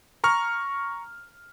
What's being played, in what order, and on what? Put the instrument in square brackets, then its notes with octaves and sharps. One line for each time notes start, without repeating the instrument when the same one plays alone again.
[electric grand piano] A#5 C#6 F6